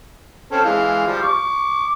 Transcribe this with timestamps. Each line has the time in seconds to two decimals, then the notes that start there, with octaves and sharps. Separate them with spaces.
0.52 C4 C#4 A4
0.64 E3 G#3 F5
1.07 F3 G3
1.22 C#6 D6